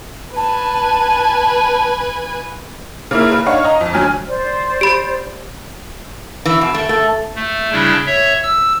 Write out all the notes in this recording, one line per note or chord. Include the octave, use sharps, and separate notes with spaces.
B4 G#5 A5
C#3 A#3 E4
B4
D4 D#4 C#5 F5 F#5 C#6
D#5 A#5
F2
D2 F#3 G#5 F6 G#6
C5 D5
G4 B5
E3
B2
A3
A3
A3
C#3 G3 D4 E4
C#5 E5
E6